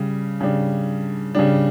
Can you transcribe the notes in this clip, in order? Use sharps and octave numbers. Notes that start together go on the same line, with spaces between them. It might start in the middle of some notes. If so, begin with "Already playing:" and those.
Already playing: C#3 G3
C#3 G3 D4
C#3 G3 D4